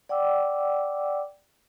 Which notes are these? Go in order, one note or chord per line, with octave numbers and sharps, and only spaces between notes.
D5 F#5 G5 D6 E6